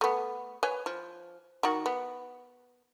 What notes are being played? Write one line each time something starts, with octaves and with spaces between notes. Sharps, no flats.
A3 B3
B4 C#5 G#5
F3
D#3 F#4
B3